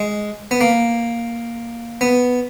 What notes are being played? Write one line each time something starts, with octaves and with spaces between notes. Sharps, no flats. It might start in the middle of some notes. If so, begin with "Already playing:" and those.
Already playing: G#3
B3
A#3
B3